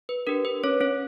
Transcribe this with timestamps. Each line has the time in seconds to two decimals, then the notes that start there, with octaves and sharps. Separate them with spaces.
0.09 B4
0.27 D4 G4 A#4
0.45 B4
0.64 C#4 C#5
0.81 C#4 C#5